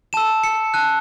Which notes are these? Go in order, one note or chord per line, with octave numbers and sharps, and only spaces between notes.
A5 E6 E7
C#7
A5 F#6